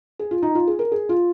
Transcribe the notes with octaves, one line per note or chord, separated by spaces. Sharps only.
G#4
F4
D#4
F4
G#4
A#4
G#4
F4